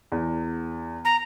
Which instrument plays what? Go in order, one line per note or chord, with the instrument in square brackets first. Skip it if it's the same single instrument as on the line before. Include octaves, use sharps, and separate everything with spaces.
[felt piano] E2
[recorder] A#5